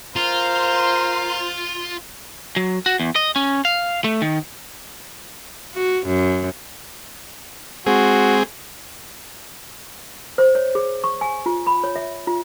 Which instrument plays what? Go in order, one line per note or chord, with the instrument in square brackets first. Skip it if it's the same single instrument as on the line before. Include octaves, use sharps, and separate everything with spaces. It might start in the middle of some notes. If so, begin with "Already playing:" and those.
[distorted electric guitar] F4 [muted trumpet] A#4 [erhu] C5
[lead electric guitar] F#3
F#4
E2
D#5
C#4
F5
A3
D#3
[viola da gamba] F#4
F#2
[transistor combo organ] G#3 C4 G#4 [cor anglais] F#4
[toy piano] C5
C#5
G#4
C#6
G#5
F4
B5
C#5
E5
F4